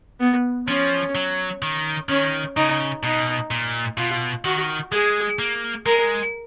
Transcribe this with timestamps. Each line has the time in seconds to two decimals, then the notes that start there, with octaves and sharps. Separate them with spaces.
0.20 B3
0.68 F3 C#4
1.15 F#3
1.62 D#3
2.09 D#3 C#4
2.57 C#3 D#4
3.03 B2 D#4
3.51 A#2
3.97 B2 F4
4.45 D#3 F#4
4.92 G#3 G#4
5.39 A#3
5.86 G#3 A#4